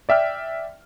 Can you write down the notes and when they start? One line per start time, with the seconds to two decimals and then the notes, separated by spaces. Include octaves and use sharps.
0.09 D5 E5 G5 F6